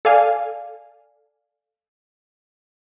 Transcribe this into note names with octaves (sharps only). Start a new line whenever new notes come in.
A4 D5 F5 G#5